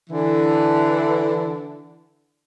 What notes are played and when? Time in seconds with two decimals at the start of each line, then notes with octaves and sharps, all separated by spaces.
0.10 D3 E3